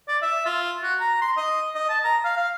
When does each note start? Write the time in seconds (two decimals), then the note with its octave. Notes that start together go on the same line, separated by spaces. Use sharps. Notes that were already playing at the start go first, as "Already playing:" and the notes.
0.08 D5
0.22 E5
0.46 F4
0.83 F#4
1.00 A#5
1.21 C6
1.37 D#5
1.75 D#5
1.89 A5
2.04 A#5
2.24 F5
2.37 F5